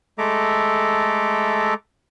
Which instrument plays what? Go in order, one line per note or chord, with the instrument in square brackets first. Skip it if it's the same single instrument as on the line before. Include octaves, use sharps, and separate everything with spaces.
[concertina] G#3 A3 A4 E5 A#5 D6